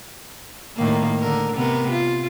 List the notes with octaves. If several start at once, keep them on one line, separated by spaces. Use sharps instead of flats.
A2 D#3 A#3
D3 A#4
C3 B3 A#4
F4